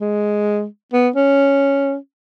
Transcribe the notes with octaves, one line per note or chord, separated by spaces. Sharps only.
G#3
B3
C#4